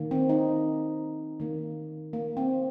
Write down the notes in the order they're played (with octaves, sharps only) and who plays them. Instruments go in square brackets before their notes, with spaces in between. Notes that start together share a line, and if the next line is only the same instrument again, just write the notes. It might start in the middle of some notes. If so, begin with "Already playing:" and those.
Already playing: [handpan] D#3 A#3
C4
D#4
D#3 A#3
A#3
C4